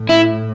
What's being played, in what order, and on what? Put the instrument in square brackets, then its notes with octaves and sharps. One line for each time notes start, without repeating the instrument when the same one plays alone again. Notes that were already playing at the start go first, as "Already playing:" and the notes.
Already playing: [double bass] A2
[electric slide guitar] E4